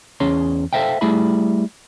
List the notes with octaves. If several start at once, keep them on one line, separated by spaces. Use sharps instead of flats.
E2 C#4 G#4 C#5 C6
A4 C5 E5 F5 G5
G3 A3 E4 G#4 E5 B5